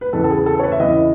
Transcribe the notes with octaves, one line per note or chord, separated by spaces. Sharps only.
B4
E2 C#3 E3 A4
A4
G#4
A4
C#5
B4
E5
E2 C#3 E3 D#5